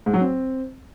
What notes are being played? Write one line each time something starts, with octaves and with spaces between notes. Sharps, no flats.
G#2
F#3
C4